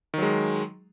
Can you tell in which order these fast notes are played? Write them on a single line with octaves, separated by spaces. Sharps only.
D#3 F#3 G#3